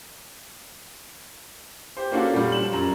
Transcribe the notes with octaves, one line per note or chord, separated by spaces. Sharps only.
G4 C5
A#3 C#4 D4 F4 F#4 A4
A#2 G3
F3 E7 F#7
F#2 A#5